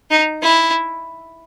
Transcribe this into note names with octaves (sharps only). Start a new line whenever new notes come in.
D#4
E4